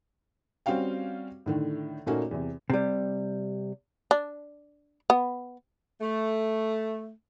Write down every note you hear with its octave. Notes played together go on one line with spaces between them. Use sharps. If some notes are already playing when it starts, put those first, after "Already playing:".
G3 C4 C#4 F#4 F5 G5
A2 D3 D#3
A#2 A3 A#3 C#4 D#4 F#4
E2 C3
C3 G3
D4
B3
A3